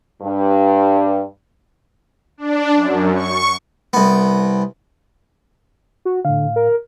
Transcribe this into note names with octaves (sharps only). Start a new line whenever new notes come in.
G2
D4
F#2
C#6
C2 B3
F#4
A2 D3 F5
A#4